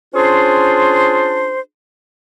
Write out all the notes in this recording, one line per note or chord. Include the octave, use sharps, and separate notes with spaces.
C#4 D4 F4 G#4 C5